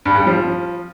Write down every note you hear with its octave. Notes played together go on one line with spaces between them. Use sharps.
G2
G3
F3